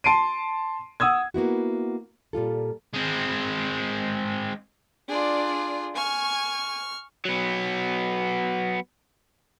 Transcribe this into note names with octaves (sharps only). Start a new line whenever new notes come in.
A5 C6 C7 D7 D#7
F#5 D#6 E6 G#6
A#3 B3 E4 F#4
A#2 G3 F4 A4
G#3 C4
D4 F4 G#4 D5
G#5 C#6 F6
F#3 B3